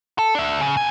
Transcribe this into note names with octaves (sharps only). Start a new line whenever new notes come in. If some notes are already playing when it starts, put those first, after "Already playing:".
A4
D4 E5
C#3
C3 G#5